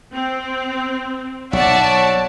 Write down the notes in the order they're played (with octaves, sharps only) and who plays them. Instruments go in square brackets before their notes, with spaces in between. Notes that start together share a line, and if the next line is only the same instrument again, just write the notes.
[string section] C4
[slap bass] B1 [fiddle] F#4 E5 [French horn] C#5 [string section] D5 A5